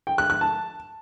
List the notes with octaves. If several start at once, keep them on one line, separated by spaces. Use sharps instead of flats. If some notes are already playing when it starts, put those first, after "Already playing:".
G5
F#6
F#6
A5